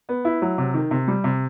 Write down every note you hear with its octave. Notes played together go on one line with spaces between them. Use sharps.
B3
E4
F#3
C3
D#3
C3
G3
C3